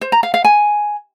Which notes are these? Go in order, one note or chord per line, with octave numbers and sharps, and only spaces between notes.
C5
A#5
F5
F5
G#5